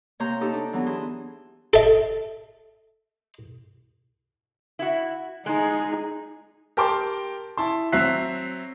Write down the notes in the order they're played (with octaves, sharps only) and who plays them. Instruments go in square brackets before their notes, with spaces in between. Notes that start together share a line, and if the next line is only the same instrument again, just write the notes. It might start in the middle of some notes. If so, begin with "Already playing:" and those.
[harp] C3 A#3 C#5 A#5 C6 G6
D#4 G4 A4 A#5
D4
E3 F#3 B3
E4 G#4 C6
[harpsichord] A4 E5
[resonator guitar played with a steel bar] E4 F#4
[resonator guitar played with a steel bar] G#3 [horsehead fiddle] D#4 G#4
[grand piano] G4 A#4 G5 A5 C6 D6
E4 A5 C6
F#3 C4 E5 F#6 B6 C7